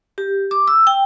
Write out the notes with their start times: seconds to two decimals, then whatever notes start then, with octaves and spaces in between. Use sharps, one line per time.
0.18 G4
0.51 D6
0.68 E6
0.87 G5